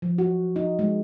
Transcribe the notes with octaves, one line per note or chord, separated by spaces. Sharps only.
F3
F#4
D#4
G#3